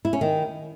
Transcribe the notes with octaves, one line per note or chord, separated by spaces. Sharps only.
E4
C#4
D#3